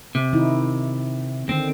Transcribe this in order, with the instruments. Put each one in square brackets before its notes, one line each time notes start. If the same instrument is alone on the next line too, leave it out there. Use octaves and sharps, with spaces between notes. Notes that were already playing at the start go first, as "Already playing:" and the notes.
[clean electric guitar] C3
[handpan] D#3 D#4 E4
[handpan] D3 D#3 [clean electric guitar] C4